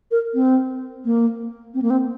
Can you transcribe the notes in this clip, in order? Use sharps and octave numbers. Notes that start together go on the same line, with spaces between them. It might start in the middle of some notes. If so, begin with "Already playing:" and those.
A#4
C4
A#3
C4
A#3
C4